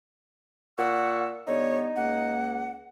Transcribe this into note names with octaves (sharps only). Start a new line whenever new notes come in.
A#2 F#5 C#6 E6
D3 G3 B3 D#4 C#5
C#2 A#3 F#5